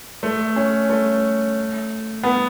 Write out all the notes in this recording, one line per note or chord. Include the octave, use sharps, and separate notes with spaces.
A3
C#4
A3
B3